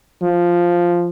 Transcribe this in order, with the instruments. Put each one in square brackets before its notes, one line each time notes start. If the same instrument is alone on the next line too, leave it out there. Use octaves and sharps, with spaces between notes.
[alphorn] F3